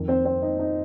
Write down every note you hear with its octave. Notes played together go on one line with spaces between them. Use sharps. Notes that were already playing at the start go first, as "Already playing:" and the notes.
Already playing: F2 D#3
C4 C5
C4 C5
D#4 D#5
D#4 D#5